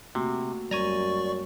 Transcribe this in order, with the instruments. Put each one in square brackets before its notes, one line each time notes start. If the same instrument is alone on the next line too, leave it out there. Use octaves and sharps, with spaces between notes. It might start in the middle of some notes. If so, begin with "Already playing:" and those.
[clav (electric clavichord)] C3 [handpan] A3 A#3 F#4
[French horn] F#2 [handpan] G3 [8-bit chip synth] D5 C#6 [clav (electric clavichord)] G#5 A#5